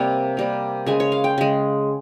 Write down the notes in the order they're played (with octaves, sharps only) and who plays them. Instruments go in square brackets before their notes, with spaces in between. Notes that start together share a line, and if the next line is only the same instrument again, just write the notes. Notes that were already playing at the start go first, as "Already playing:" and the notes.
Already playing: [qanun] C3 G3 A#3 C#5
C3 G3 A#3
C#3 G#3 G#5
C#5
F5
G5
C#3 G#3